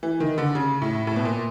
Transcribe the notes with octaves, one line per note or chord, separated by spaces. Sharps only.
E3
D#3
D3
C#3
A2
A2
B2
A#2